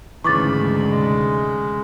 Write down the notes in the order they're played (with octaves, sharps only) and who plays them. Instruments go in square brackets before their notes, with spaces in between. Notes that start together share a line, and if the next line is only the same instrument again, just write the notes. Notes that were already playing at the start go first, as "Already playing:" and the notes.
[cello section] D2 G#2 [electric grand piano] C#3 E3 [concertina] B5 [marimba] C#6 D6 A6
[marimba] C3 [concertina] G#3